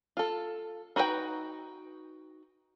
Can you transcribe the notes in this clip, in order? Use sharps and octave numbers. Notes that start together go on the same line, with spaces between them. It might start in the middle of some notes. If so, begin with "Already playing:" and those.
F4 A4
D#4 F#4 B4 C5 G5